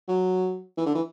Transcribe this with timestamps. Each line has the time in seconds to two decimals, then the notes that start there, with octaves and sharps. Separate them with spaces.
0.08 F#3
0.78 E3
0.86 D3
0.95 E3